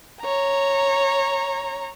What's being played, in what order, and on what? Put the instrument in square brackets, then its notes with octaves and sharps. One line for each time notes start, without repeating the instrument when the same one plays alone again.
[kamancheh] C#5 A#5